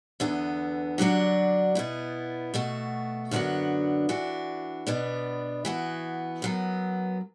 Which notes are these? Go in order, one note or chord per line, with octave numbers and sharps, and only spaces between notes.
E2 D3 B3
D3 F#3 D4 F#4
B2 B3 E4
B2 A3 F#4
F#2 D3 B3 D4 F#4
E3 D4 F#4
B2 B3 D4
E3 B3 F#4
F#2 F#3 B3